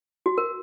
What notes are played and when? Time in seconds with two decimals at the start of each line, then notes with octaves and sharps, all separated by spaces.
0.26 F#4
0.38 A#4